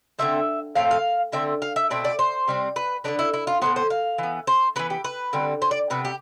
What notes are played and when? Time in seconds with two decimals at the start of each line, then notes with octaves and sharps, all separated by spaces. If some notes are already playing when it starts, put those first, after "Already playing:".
0.19 D3 A3 C4 E5
0.76 A2 F3 A3 C4 F5
0.91 F5
1.32 D3 A3 C4 E5
1.62 F5
1.76 E5
1.90 B2 A3 C4 D5
2.05 D5
2.19 C5
2.48 C3 G3 C4
2.76 B4
3.04 D3 G3 B3 D4
3.19 E4
3.34 E4
3.47 F4
3.62 A2 E3 B3 C5
3.76 C5
3.90 F5
4.18 E3 B3
4.47 C5
4.76 E3 B3 B4
4.90 G4
5.04 B4
5.33 D3 G3 C4
5.62 C5
5.71 D5
5.90 C3 G3 B3 B4
6.05 G4